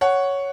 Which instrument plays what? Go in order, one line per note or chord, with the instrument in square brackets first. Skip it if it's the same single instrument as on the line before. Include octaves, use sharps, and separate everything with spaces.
[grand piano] C#5 F#5